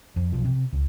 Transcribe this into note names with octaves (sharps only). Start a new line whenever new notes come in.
F2
B1 F3
C3
C#2